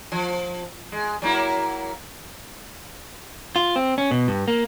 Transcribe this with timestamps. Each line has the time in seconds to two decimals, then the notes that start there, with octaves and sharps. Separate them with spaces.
0.12 F3
0.92 G#3
1.22 F#3 A#3 E4
3.56 F4
3.76 C4
3.98 C#4
4.11 B2
4.28 G2
4.48 A#3